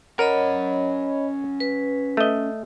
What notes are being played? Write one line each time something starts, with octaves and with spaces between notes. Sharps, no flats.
C#4 A#4 C#5 D#5 F#5 B5
B4
A3 D#5